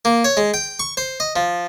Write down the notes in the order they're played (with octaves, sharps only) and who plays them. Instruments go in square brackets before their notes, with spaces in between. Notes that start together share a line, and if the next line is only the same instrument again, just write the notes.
[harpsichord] A#3
C#5
G#3
G5
C#6
C5
D#5
F3